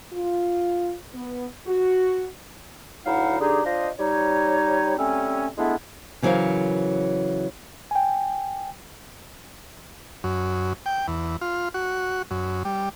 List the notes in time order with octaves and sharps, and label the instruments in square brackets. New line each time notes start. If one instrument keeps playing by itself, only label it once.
[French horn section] F4
B3
F#4
[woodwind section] D2 F#3 D#4 E4 F5 F#5
D3 D4 D#4 G4 G#4
D4 F4 C5 D#5
G3 D#4 C#5
G3 A3 C4 C#4
G#3 A3 B3 D4 E4
[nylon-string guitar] C#3 E3 F#3 A#4 C5 F5
[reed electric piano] G5 G#5
[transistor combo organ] F#2
G5
E2
F4
F#4
F#2
G3